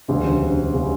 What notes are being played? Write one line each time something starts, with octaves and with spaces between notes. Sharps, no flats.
E1 D2 C#3 G3
C#3 G3